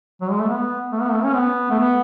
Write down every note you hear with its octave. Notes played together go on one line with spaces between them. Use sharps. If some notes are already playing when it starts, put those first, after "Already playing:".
F#3
G#3
A3
B3
A3
B3
A3
C#4
B3
A3
B3